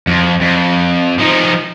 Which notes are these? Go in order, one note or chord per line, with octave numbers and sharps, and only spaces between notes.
F2
F2
F3 D#4